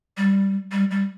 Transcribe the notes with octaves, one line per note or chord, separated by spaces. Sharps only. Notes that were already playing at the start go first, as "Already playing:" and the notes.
G3
G3
G3